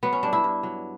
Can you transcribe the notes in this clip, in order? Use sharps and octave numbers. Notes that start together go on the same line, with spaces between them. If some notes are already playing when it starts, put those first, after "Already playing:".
F#3 B3
C#4
G2 D4
E4
G2
F#3